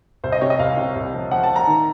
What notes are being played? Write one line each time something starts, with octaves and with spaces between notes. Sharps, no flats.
C2 C5
D#5
C3 C#5
D#5
C2 F5
C3
C2
F3
F3 F#5
A5
F3
A#5
D#3